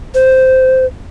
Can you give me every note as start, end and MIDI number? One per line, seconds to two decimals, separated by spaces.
0.14 0.85 72